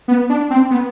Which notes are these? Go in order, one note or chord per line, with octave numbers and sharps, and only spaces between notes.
B3
D4
C4
B3